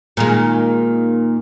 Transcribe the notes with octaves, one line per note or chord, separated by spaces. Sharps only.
A#2 D#3 G#3